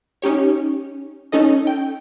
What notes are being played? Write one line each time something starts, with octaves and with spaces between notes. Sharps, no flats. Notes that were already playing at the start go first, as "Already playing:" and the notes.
C#4 D#4 G4 C#5
C#4 D#4 A4 D#5
G5